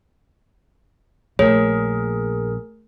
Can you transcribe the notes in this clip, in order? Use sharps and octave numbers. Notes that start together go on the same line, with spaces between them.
A#1 A3 G#4 A#4 C#5